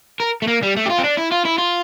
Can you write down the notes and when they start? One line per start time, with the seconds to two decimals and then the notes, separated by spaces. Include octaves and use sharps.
0.20 A#4
0.42 A3
0.47 A#3
0.63 G3
0.76 A3
0.86 G4
0.90 F4
0.99 C4
1.04 D4
1.18 E4
1.32 F4
1.45 E4
1.58 F4